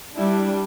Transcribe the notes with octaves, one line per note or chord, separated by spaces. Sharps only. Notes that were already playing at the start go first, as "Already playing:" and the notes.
G3 D4 E4